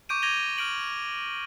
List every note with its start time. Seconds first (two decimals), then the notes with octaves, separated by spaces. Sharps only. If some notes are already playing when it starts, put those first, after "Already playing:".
0.09 C#6 D6 G6 D7 D#7
0.22 D6 G#6 A#6 D#7 F7 G7
0.58 F6 G6 D7 F#7